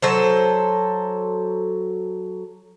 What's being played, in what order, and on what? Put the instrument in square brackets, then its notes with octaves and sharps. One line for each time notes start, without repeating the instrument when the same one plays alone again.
[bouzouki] F#3 A4 C5